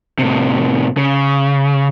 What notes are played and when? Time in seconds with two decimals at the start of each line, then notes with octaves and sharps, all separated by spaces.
0.19 A2 C3
0.97 C#3